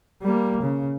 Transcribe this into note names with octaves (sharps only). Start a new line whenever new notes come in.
G3 A#3
C#3